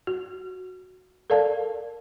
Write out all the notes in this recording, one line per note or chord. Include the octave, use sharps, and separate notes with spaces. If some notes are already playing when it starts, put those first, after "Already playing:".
F#4
A4 A#4 D5 F5 A5